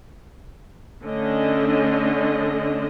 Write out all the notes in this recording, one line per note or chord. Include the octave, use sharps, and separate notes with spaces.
D3 A3 C#4 D4 D#5